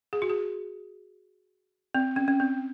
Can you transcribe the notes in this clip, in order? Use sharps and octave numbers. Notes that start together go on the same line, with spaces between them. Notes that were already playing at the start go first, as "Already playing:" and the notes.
G#4
F#4
G#4
C4
C#4
C#4
C4